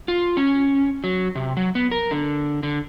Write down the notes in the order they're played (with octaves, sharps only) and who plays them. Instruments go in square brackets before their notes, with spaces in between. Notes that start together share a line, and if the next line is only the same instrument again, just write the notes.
[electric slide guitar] F4
C#4
F#3
C3
F#3
B3
A#4
D3
D3